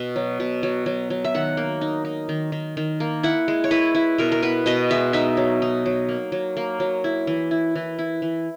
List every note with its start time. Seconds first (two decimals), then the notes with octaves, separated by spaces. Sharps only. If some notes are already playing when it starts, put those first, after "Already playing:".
Already playing: B2
0.16 F#3
0.40 B2
0.63 F#3
0.86 F#3
1.10 F#3
1.24 E5
1.34 D#3 F#5
1.57 A#3
1.81 D#4
2.05 D#4
2.29 D#3
2.52 D#3
2.77 D#3
3.00 A#3
3.23 E4 F#5
3.48 G#3
3.64 C#5
3.71 E4 B4
3.95 E4
4.18 B2 A#4
4.32 A#4
4.43 B3 B4
4.66 B2 D#5
4.91 G#3 E5
5.13 D#4 E5
5.37 F#3
5.62 D#4
5.86 F#3
6.09 A#3
6.32 F#3
6.57 A#3
6.80 F#3
7.04 E4
7.27 E3
7.51 E4
7.76 E3
7.99 E4
8.22 E3